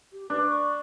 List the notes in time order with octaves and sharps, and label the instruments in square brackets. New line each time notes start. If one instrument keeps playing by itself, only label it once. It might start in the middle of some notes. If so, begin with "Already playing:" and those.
[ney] G4
[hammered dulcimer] D4 [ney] B4
[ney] C#6